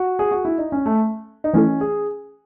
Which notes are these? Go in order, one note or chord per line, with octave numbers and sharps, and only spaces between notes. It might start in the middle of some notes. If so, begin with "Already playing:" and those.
Already playing: F#4
G#4
F#4
E4
D#4
C#4
A3
D#4
E3 A3 C#4 E4 A4
G#4